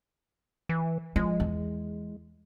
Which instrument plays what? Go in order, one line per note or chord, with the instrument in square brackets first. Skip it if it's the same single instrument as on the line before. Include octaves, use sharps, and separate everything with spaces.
[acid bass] E3
[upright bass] F3 [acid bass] G#3
[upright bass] E2